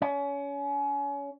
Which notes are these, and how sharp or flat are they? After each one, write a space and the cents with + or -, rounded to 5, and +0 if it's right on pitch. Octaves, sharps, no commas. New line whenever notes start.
C#4 +30